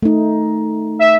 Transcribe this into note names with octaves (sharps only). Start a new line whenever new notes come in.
A3 D#4
E5